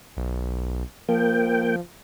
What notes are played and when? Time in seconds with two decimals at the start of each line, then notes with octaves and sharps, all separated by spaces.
0.17 B1
1.08 F3 A#3 G5